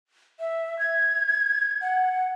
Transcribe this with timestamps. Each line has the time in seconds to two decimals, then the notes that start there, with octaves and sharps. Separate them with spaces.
0.40 E5
0.79 G#6
1.81 F#5